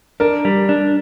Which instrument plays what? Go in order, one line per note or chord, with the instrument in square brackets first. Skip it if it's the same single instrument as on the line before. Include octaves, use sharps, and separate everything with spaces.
[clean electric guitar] D4 [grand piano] A#4
[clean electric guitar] G3
D4